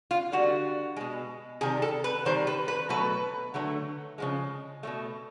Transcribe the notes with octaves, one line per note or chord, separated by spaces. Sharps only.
F4
D3 G3 F#4
B2 G#3
C3 D#3 G3 G#4
A4
B4
C3 D#3 G3 C5
B4
B4
B2 F#3 A3 B4
D3 F#3 A3
C#3 F3 G#3
B2 F#3 A3